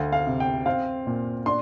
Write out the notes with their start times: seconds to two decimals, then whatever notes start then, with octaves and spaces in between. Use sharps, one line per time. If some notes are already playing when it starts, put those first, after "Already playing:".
Already playing: D2 F5
0.13 F5
0.27 C3
0.40 G5
0.66 C4 F5
1.07 A#2
1.46 D4 C6